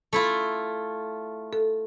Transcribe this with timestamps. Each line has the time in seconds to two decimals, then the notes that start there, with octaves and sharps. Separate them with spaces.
0.13 A3 E4 F4
1.53 A4